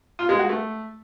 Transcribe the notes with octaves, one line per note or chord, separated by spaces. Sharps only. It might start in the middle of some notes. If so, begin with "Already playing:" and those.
F4
G#3
F#4
A3